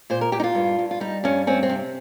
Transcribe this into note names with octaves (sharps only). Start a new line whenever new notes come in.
A#2 C5
A#4
A#2 G4
D#4
F4
G2
G2
F4
G3 D#4
G2 C#4
C4 C#4
C4
C3